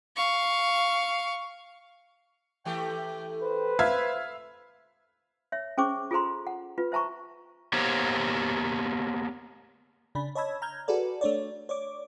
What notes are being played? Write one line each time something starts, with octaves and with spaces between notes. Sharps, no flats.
F5 C#6
E3 A3 G4 G5
B4 C5
E5 F5 G#6
C#5 E5
C#4 G#4 C5 C#6 D6
F4 G#4 A4 C5 A#5 C6
F#5
F4 B4
C5 E5 A5 A#5 C#6
A#3 B3 G4 C5 C#5 F5
C#3 D4 B5
C#5 D#5 A5 B5 E6 G#6
A#5 F6 G6 G#6
F#4 G#4 A4 B4 D5
A3 D4 C#5 D5
C#5 D5 D6